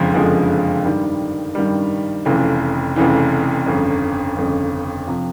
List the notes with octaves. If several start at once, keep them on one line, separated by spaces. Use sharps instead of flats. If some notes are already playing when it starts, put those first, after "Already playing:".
Already playing: F#1 F2 D3 F3 G#3
F#1 F2 D3 F3 G#3
G2 D#3 G3
G2 D#3 G3
F1 F2 C#3 E3
F1 F2 C#3 E3
G1 F2 C#3
G1 F2 C#3
C3 F3